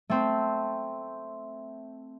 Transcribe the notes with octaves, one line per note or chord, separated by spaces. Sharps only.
A3 C4